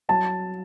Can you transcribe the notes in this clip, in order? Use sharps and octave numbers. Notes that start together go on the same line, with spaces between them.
F#3 A5